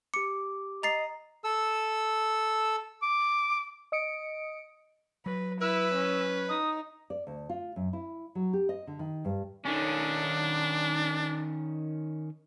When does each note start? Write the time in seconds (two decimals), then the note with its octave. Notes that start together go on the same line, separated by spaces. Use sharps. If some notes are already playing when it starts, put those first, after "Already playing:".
0.14 G4 D6 C#7
0.83 D#5 A#5 A6 C7
1.44 A4 E6
3.02 D6
3.92 D#5 D#6 C#7 D7
5.26 F#3 B4
5.61 E4 B4 E6
5.95 C#4
6.49 D#4 D#6
7.10 D5
7.27 D2
7.49 F4
7.76 F#2
7.93 E4
8.35 F#3
8.53 G4
8.69 D#5
8.87 D3
8.99 D#3
9.25 G2
9.65 D#3 C#4 D4